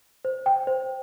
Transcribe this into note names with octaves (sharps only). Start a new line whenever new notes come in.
C5
G5
C5